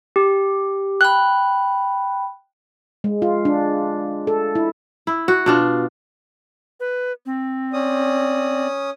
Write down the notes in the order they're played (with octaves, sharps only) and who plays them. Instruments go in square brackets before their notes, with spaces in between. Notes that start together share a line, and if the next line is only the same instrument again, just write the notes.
[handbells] G4
[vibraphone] G5 B5 [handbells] F#6
[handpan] G#3
F4
D4
A4
E4
[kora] E4
F#4
B2 D4 F4
[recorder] B4
C4
[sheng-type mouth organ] C#4 D#6 [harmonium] D5